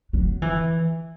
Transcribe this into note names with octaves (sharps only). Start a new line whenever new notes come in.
F#3
E3